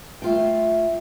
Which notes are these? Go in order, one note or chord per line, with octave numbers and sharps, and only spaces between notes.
A3 F4 G5